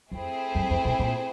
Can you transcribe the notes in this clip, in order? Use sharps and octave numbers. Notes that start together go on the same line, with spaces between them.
F2 A3 C4 E4 G#4 C5
F#2
F2
B2
A#2